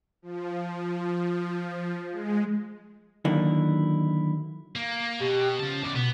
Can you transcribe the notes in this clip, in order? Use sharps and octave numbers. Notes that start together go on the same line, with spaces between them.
F3
G#3
D3 D#3 F#3 A#3 D#4 E4
A#3
B2 G4
C#3 F3 A5
E2 D5 D6
B2 B3